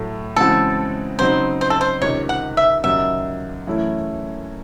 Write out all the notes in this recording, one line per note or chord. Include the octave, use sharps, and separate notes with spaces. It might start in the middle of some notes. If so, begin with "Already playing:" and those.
Already playing: A2 F#3 A3
C#3 E3 G#3 C4 F#4 A4
C#3 F#3 C4 D#4 C5
C5
A4
C5
C#2 C3 D#3 C#5
F#5
E5
D#2 C#3 F#3 E5
F#2 E3 A3 C#4 E4